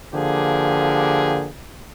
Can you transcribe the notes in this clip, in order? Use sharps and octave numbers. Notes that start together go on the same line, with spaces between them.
D3 F3 A#3 G4 G#4